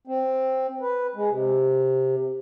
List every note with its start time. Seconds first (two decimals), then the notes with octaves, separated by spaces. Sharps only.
0.07 C4
0.81 B4
1.16 G#3
1.30 C3